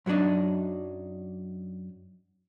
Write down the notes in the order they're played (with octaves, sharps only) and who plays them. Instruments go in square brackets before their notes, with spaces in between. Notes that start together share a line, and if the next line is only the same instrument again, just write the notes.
[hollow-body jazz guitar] F#2 F#3 G3 D4 D#4